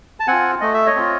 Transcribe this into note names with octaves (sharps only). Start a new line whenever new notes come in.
A5
C4 F4 F#5 G#5
A3 D#5
E5
C#5 D#5
C4 F4